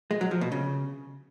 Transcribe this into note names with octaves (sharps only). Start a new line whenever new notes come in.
G#3
F#3
F3
B2
C#3